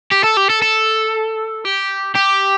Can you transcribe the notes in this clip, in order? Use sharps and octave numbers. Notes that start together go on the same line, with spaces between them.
G4
A4
G4
A4
A4
G4
G4